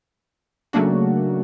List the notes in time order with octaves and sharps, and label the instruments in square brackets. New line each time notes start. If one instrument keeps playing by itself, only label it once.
[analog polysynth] C#3 F#3 A3 A#3 D4 F#4